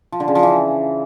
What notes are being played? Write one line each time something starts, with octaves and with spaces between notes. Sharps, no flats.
F3
D3
C#3
F3
E3